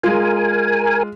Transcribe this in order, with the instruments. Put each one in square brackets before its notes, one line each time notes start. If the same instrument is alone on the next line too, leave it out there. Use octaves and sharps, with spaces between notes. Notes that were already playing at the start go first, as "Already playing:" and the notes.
[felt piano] G#3 F4 [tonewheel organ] A#4 G#5